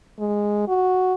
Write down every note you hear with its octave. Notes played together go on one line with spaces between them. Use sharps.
G#3
F#4